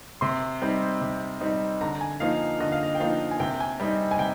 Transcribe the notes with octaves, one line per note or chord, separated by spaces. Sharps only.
C3 C6
G3 C4 D#4
C3
G3 C4 D#4
D3 A#5
G#5
F3 A#3 D#4 F5
D3 D#5
F5
D#5
G5
F3 A#3 D#4 F5
G#5
C3 G5
G#5
G3 C4 D#4
G#5
C3 G5